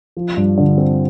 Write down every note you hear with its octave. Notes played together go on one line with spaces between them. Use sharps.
F3
G2
D3
C4